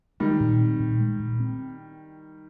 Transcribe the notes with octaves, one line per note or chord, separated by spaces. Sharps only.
D#3 G3 G#3
A#2
C4
A#2
G#3
A#2
C4